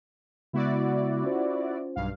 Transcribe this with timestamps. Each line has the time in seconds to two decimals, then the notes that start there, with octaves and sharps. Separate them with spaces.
0.53 C#3 G#3 B3 E4 F#4 D5
1.24 C#4 F4 C5
1.96 B1 G2 F5